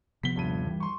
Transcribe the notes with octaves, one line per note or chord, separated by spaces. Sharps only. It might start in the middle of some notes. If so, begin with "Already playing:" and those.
C3 F3 B3 B6 G7
D#1 G2 D#7
E3 G3
C6 C#6